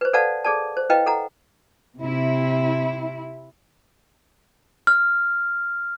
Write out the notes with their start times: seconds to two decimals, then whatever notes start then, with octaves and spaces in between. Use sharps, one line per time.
0.01 B4 C5
0.13 A4 B4 D5 F5 F#5 A5
0.44 G#4 A4 D5 A5
0.77 C5
0.90 E4 B4 D#5 F5 G5
1.06 A4 F#5 A#5
2.00 C3 E4
4.87 F6